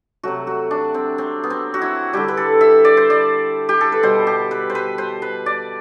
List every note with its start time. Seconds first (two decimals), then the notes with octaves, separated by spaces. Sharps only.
0.23 C3 F#3 A3 F#4
0.47 F#4
0.71 D4
0.94 C4
1.18 C4
1.44 B3
1.50 C4
1.74 F#4
1.82 E4
2.13 D3 G3 G4
2.28 B4
2.37 A4
2.61 E5
2.85 D5
2.97 C5
3.10 D5
3.69 G4
3.81 A4
3.92 B4
4.03 B2 G3 C5
4.27 G4
4.51 B4
4.70 C5
4.75 B4
4.98 C5
5.22 B4
5.46 D5